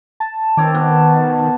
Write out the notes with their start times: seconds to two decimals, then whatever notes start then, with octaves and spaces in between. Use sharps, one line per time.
0.20 A5
0.57 D#3 C4 C#5 D6
0.74 B2